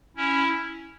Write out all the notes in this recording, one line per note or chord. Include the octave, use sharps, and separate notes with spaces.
C#4 E4